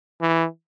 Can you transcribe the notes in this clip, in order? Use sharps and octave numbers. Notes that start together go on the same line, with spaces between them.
E3